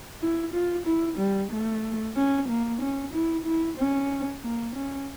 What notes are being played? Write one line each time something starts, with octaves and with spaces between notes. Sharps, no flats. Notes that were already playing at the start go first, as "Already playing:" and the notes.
E4
F4
E4
G3
A3
C#4
A#3
C#4
E4
E4
C#4
A#3
C#4